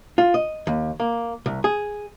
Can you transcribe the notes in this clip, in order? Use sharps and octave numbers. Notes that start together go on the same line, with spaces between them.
F4
D#5
D#2
A#3
C2
G#4